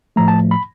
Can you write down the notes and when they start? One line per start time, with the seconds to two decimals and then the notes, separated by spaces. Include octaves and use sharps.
0.16 A2 F3 A3 A#5
0.28 A5
0.51 B5